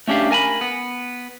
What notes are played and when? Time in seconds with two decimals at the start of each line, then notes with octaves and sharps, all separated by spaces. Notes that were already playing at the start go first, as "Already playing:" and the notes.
0.08 A3 C#4 D4 G4 F5
0.31 A#4 G#5 A5 B5
0.61 B3